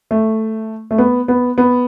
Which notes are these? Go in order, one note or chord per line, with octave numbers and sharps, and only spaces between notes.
A3
A3
B3
B3
B3